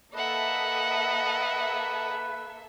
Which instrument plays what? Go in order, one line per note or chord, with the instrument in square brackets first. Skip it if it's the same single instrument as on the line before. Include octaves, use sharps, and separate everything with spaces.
[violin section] A#3 A4 E5 [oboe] B4 [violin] D#5 F#5